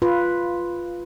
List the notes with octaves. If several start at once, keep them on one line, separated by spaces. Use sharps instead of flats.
F4 B4